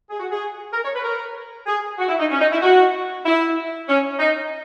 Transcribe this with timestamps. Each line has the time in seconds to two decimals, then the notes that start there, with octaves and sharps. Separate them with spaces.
0.10 G#4
0.20 F#4
0.31 G#4
0.72 A#4
0.84 C#5
0.94 B4
1.04 A#4
1.67 G#4
1.98 F#4
2.09 E4
2.20 D#4
2.31 C#4
2.40 D#4
2.52 E4
2.62 F#4
3.25 E4
3.88 C#4
4.19 D#4